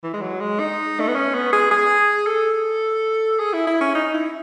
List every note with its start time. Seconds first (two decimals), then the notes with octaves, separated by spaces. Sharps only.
0.04 E3
0.14 G#3
0.22 F#3
0.41 G#3
0.60 D#4
1.00 A3
1.08 B3
1.15 C#4
1.34 B3
1.53 G#4
1.71 G#4
2.27 A4
3.39 G#4
3.53 E4
3.67 E4
3.81 C#4
3.95 D#4
4.14 E4